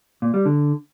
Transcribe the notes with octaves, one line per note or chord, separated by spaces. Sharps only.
A#2
G3
D3